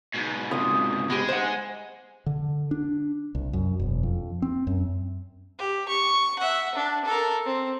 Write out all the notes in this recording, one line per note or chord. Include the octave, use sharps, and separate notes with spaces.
G#2 B2
C#2 C3 D#6
G#3 B3 G4
C5 F#5
D3
D4
C2
F#2
E1
F2
C4
F#2
G4
C#6
E5 F#5
D4
A4 A#4
C4